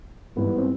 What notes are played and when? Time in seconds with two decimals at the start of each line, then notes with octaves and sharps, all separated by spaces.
0.36 G#2 E3 G3 B3
0.56 C4